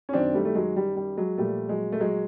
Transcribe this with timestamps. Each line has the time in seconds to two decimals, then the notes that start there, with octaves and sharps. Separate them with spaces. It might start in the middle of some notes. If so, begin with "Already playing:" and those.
0.09 C#4
0.13 F#2 D#3 C4 D4
0.34 G3 A3
0.45 A3
0.55 F#3 G#3
0.76 G3
0.96 G3
1.17 F#3 G#3
1.38 A#2 F3 G3 A3
1.69 F#3 G#3
1.92 A3
2.00 F#3 G#3